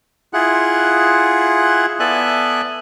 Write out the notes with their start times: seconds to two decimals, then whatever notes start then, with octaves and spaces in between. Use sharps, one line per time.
0.33 E4 F4 G#4 F#5
2.00 B3 A4 D5 E5 G#5 F#6